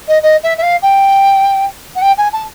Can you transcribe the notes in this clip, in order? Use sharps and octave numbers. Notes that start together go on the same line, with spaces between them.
D#5
D#5
E5
E5
F5
G5
F#5
G5
G#5
A5